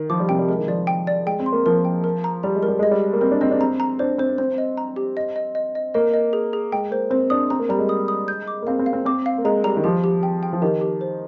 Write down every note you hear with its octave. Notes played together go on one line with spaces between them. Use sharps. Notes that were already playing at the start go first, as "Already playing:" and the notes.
Already playing: D#3
F3 D6
G3
C3 G5
G3
G#3 A#4
D#3
F3 D5
G5
D5
G#3 G5
C4
C6
A#3
F3 A#4
G5
A#4
A#5
G3 A#5
G#3
A#4
G3
G#3 D#5
G3
D#5
A#3
C4 A#4
D4
C4 D#5
D4
C4 A#5
A#5
D4 C5
C4 C5
C4 C5
D#5
A#5
G4
D#5
D#5
D#5
D#5
A#3 D#5
D#5
G#4
G#4
G#3 G5
A#3 C5
C4 C5
D4 D#6
C4 A#5
A#3
G3 A#5
G#3
D#6
D#6
G6
D6
A#3
C4 F5
C4
F5
C4
C4 D6
F5
A#3
G#3 A#5
G3 A#5
D#3
F3 G4
G4
G5
G5
F3
D#3 G4
G4
C5